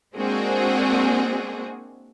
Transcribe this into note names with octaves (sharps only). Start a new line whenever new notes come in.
G#3 A#3 C4 D4 F#4 G#4